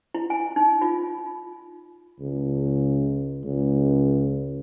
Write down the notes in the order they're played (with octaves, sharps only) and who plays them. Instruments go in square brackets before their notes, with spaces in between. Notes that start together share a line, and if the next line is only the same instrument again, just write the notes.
[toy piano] E4
G#5
D#4
F4
[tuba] C#2
C#2